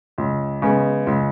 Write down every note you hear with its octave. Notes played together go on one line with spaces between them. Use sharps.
C#2
C#3 G#3 B3
C#2